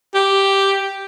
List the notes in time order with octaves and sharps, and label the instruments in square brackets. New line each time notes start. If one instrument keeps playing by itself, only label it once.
[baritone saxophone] G4